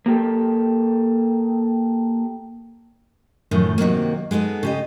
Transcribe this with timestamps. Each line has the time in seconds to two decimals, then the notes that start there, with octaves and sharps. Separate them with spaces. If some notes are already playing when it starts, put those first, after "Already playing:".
0.06 A#3 G4 A4
3.51 F#2 A2 D#3 F3
3.78 C3 D#3 F#3 A#3
4.31 G#3 B3 D#4 A4
4.63 C#3 G4 D#5